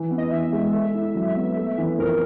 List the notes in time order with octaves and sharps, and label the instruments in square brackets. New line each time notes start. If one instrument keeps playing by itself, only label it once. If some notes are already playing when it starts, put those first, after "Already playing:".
Already playing: [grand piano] E3
B3
[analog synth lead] D#5
[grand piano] E3 [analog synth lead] E5
[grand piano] G#3
A4
E4
F#3
B3
A3
E3
[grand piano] F2 [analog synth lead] A#4